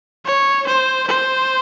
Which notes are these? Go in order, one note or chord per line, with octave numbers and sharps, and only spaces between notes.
C#5
C5
C5